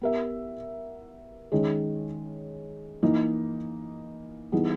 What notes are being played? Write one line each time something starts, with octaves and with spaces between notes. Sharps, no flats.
B3 G4 A#4 E5
D#3 G#3 C#4
E3 A#3 D#4
E3 G3 B3 D#4 G#4